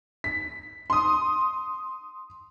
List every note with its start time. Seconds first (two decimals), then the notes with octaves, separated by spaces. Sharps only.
0.24 B6
0.90 C6 D#6